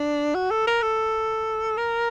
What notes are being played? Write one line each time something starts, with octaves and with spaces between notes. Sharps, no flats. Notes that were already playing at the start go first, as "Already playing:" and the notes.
Already playing: D4
F#4
A4
A#4
A4
A#4